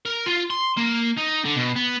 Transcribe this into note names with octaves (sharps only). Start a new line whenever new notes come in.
A#4
F4
C6
A#3
D#4
D3
B2
B3